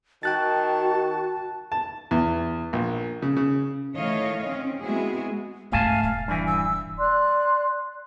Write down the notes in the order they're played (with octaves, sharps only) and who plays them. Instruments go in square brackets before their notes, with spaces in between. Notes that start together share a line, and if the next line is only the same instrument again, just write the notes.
[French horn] D#3 [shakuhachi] F#4 [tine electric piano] G5 F#6 A6 [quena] A5
[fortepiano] A5
E2
A#1
C#3
C#3
[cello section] D#3 E3 A3 C#5 D#5 F5
C4 C#4
G#3 B3 C4 E4 F#4 G#4
[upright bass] G#1 G#2 [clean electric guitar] A3 G#5 A5 [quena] F5
[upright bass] D#1 [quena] F5
[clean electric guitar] G2 E3 [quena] G#5
[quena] E6
[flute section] D5 C6 F#6